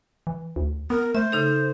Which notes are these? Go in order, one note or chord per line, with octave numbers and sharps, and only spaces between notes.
E3
D2
B3 A#4
A3 C5 E5
C#3 D#4 A4